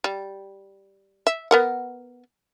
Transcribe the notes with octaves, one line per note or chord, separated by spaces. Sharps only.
G3
E5
B3 A#4 F#5